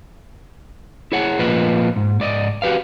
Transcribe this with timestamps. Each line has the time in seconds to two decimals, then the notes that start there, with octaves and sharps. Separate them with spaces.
1.12 E4 G#4 C#5 F#5
1.39 A#2 F3 A#3 F4 B4 D#5
1.96 G#2
2.20 G#2 D5 D#5
2.62 F#4 G4 B4 F5